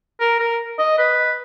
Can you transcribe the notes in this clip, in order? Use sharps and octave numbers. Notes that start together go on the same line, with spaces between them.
A#4
A#4
D#5
B4